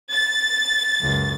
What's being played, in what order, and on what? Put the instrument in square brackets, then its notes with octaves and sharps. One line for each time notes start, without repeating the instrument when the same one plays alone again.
[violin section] A6
[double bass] C#2 F#2